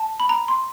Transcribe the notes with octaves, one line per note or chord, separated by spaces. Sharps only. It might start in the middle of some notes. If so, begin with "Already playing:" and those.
Already playing: A5
B5
A#5
C6